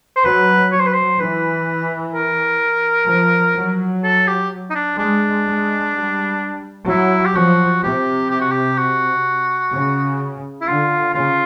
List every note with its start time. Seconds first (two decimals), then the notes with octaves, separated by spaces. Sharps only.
0.16 C5
0.24 F#3 B4
0.72 F#3 C#5
0.79 C5
0.86 B4
0.93 C5
1.20 E3 B4
2.14 A#4
3.09 F3
3.57 F#3
4.04 A4
4.27 G4
4.70 D#4
4.75 D4
4.98 G#3 D4
5.47 G#3
5.94 G3
6.88 F#3 E4
7.25 G4
7.36 F3 F#4
7.83 C3 G4
8.30 G4
8.41 F#4
8.51 G4
8.78 F#4
9.73 C#3
10.61 E4
10.67 D3 F4
11.14 C#3 F4